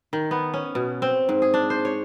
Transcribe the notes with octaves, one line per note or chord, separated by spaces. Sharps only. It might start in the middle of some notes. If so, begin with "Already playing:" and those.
D#3
B3
C#4
B2
C4
G#2
G#4
D4
C5
C#5